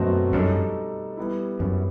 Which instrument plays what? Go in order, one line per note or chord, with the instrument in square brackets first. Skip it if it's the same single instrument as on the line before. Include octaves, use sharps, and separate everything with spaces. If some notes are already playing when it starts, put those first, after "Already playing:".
Already playing: [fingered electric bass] F#2 [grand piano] B2 F#3 A3 C4 F#4
[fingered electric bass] F#2 [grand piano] G3 D#4 A4
[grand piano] G3 B3 E4
[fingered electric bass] F#2